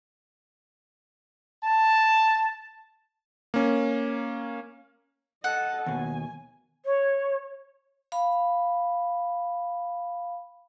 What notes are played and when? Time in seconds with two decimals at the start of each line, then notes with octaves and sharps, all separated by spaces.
1.63 A5
3.54 A#3 C#4
5.44 A4 D#5 F#5
5.86 D#2 B2 G#5
6.85 C#5
8.12 F5 B5